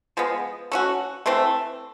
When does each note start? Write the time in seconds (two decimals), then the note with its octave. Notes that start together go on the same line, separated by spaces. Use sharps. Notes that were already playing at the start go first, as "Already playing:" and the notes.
0.17 F3 G#3 B3
0.72 A3 C#4 F#4
1.26 E3 A3 C4